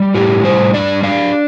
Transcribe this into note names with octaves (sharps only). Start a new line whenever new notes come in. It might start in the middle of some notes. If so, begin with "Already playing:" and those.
Already playing: G3
A2 G4
G3 C5
D4 D5
D4 F5